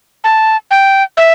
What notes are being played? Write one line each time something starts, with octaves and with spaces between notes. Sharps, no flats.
A5
G5
E5